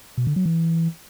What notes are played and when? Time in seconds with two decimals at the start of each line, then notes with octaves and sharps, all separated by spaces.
0.18 B2
0.27 D3
0.36 F#3
0.46 E3